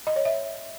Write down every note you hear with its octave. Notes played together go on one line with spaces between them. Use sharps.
D#5
C#5
E5